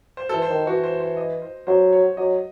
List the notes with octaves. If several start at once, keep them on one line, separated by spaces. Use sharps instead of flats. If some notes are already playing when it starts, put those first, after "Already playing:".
C5
A4
E3
C5
D#3
E3 F#4
C5
C5
D#5
C5
F#3 C5
C#5
F#3 D#5